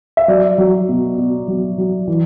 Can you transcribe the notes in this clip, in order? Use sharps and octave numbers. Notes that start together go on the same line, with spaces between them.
E5
F#3 D5
F#3
B2
B2
F#3
F#3
E3